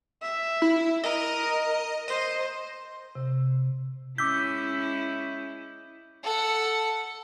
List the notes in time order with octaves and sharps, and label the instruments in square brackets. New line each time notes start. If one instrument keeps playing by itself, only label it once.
[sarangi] E5
[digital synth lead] E4
[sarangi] A#4 [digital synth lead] D#5
[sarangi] C5 [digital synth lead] D#5
[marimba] C3
[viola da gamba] G#3 C#4 E4 [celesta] D6 E6 B6 [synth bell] G6
[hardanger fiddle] A4 F#5